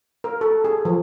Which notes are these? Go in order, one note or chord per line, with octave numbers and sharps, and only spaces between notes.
A#4
A4
G#4
F3